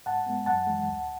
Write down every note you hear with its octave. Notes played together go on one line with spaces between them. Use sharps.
G#2 F#5 A5
G#3 B3
F#2 F#5 A5
E3 G#3
D2